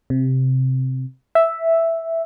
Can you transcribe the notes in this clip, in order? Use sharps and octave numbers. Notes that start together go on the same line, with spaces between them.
C3
E5